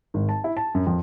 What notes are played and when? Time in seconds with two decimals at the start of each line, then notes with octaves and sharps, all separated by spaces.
0.14 G#1
0.29 A5
0.44 E4
0.57 A5
0.75 F#2
0.87 F2